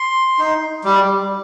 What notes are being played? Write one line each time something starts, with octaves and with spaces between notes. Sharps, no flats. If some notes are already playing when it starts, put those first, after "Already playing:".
Already playing: C6
D#4
G3